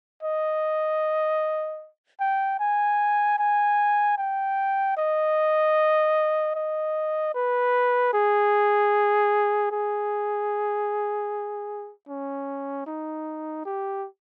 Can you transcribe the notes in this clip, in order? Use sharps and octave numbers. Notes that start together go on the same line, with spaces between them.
D#5
G5
G#5
G#5
G5
D#5
D#5
B4
G#4
G#4
C#4
D#4
G4